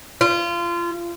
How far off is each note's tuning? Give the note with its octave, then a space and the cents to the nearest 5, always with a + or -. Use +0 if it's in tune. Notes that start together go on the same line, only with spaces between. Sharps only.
F4 -25